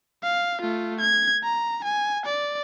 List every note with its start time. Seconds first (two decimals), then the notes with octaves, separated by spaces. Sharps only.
0.23 F5
0.61 A3 F4
1.00 G#6
1.44 A#5
1.84 G#5
2.26 D5